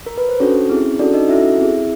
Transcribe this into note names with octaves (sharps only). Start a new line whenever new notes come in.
A#4
B4
C5
C#4 D4 F#4 A4 C#5
C4 E4 G#4
C#4 D4 F#4 A4 D5
D#4 D#5
C#4 E4 F#4 A4 E5
C4 E4 G#4